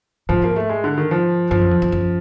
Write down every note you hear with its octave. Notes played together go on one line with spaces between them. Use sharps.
G#2 F3
A#3
A3
G#3
D3
D#3
F3
G2 F3
F#2
F2
F2
F#2